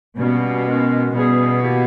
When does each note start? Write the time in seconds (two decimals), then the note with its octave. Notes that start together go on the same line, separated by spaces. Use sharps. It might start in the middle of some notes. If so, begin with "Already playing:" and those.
0.17 G2 B2 G3 A#3 C#4
0.66 D#3 G#3 C#4
1.14 B2 E3 G3 C#4 G#4
1.61 D#3 A#3 E4 G4